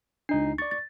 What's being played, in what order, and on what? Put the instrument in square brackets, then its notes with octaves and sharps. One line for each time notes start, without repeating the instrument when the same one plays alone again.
[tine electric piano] C#2 D#4 C7 [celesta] D4
[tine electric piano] D5 C#6 [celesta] A6
[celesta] A6